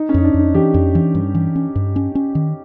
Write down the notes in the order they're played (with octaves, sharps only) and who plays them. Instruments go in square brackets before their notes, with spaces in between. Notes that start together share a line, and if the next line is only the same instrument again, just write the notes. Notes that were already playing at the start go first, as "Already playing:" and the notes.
Already playing: [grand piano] D#4
C#4
[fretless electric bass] F2 [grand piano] D#4
[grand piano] D4
[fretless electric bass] F2 [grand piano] D#4
[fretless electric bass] E3 [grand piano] G4
[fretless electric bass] F2
E3
G2
E3
C#4
G2
C#4
C#4
D#3